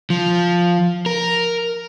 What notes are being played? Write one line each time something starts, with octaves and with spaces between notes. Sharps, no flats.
F3
A#4